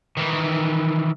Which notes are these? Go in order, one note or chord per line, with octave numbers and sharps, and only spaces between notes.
D#3 E3